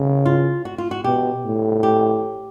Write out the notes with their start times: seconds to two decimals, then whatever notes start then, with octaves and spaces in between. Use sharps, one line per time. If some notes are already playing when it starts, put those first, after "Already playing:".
Already playing: C#3
0.26 F4
0.65 F#4
0.78 F4
0.91 F#4
1.04 B2 G4
1.45 A2
1.83 G4